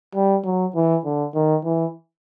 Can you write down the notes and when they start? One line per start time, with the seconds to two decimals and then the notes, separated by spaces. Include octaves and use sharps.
0.15 G3
0.45 F#3
0.75 E3
1.05 D3
1.35 D#3
1.64 E3